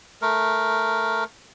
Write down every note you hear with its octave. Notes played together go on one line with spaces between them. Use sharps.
A3 A#4